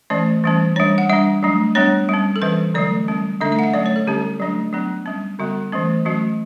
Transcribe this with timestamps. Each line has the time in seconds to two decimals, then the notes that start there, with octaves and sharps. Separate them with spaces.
0.10 E3 A3 C#4 D5
0.44 E3 G3 C#4
0.76 G3 D4 C#5
0.98 F#5
1.10 G3 D4 E5
1.43 F#3 A3 D4
1.75 G3 B3 D4 C#5
2.09 G3 C#4
2.36 A4
2.42 E3 G3 C#4 B4
2.74 D3 F#3 A3 D5
3.08 G3 C#4
3.41 D3 A3 D4 E5
3.52 E5
3.59 F#5
3.63 E5
3.74 F#3 A3 C#4 D5
3.86 C#5
3.96 A4
4.07 D3 G3 C#4 G4
4.40 F#3 A3 D4
4.73 F#3 B3 D4
5.06 G3 C#4
5.39 D3 G3 B3 F#4
5.72 E3 A3 C#4
6.05 F#3 A3 C#4 F#4